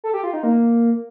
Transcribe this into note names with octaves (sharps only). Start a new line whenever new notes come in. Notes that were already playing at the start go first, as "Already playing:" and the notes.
A4
G4
F4
D#4
A#3